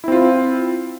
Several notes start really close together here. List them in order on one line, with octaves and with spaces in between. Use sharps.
E4 C4 F4